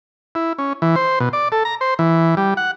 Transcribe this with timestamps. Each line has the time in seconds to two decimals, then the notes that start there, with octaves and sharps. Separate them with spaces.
0.35 E4
0.58 C#4
0.82 E3
0.96 C5
1.20 B2
1.33 D5
1.52 A4
1.65 A#5
1.81 C5
1.99 E3
2.37 G3
2.57 F#5